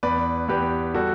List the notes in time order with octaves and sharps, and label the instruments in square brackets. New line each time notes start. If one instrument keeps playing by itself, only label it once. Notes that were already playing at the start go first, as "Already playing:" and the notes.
[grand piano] E2 B4 D5
E2 G4 B4
G3 F#4 A4